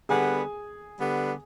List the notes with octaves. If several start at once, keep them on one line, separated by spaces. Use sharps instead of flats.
D3 G3 B3 G#4 G#5
D3 G3 B3